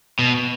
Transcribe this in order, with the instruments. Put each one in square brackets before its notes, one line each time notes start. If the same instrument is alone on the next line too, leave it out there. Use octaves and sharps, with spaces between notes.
[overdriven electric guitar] B2